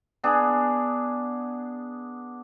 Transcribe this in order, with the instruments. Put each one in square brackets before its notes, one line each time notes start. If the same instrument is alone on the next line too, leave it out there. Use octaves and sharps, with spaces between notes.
[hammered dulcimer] B3 D4 G#4